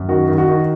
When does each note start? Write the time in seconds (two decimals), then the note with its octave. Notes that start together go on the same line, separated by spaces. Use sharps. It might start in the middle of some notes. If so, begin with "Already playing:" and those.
Already playing: F#2
0.09 D#3 F#4
0.28 D#3
0.38 F#4
0.48 D#3